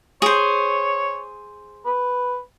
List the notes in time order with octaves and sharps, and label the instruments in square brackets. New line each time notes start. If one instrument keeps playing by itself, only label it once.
[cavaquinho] G#4 C5 [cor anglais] C#5
[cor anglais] B4